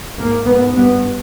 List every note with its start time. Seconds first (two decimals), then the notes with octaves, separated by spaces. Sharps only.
0.18 G#2 A#3
0.46 G#2 B3
0.75 G2 B3